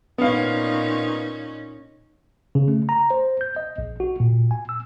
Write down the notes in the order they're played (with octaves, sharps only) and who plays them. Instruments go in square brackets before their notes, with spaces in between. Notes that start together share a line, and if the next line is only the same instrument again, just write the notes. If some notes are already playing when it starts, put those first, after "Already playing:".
[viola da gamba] A#2 C#4 D#4 [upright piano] B3 F5
[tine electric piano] C#3
A3
A#5
C5
G6
D#5
A#1
F#4
A#2
G#5
E6